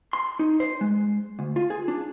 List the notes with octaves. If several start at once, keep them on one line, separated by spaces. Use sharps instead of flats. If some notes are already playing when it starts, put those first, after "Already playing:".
C6
D#4
C5
G#3
D2
F4
G#4
D4